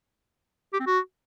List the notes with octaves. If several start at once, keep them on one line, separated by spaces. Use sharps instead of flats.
G4
C4
F#4